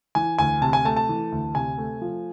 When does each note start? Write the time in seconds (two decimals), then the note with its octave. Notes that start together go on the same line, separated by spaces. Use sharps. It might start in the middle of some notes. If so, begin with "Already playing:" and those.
0.15 E3 G#5
0.38 D2 G#5
0.61 C3 A5
0.73 G#5
0.85 A3 A5
0.96 A5
1.09 E3
1.32 D2
1.55 C3 G#5
1.78 A3
2.02 F3